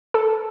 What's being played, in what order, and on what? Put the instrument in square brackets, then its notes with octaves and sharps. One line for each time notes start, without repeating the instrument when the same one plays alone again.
[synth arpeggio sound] A4